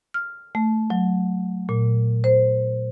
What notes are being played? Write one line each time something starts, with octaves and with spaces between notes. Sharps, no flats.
F6
A3
F#3
A#2
C5